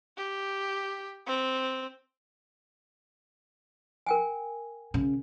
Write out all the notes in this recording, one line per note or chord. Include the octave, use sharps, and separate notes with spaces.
G4
C4
A#4 G5 G#5
C#3